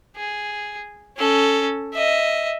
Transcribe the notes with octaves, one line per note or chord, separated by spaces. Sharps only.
G#4
C#4 A4
D#5 E5